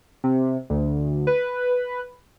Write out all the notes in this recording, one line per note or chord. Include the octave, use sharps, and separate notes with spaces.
C3
D2
B4